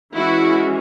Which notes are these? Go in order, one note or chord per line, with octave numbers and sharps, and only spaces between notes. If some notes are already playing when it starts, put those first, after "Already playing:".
E3 G#3 C#4 E4 F#4